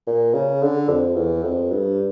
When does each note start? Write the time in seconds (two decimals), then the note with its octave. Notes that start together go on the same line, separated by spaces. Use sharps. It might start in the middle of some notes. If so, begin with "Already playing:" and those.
0.07 A#2
0.34 C#3
0.62 D3
0.89 F2
1.16 E2
1.44 F2
1.71 G2